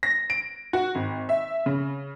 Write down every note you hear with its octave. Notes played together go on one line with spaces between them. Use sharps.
A#6
D7
F#4
G#1
E5
C#3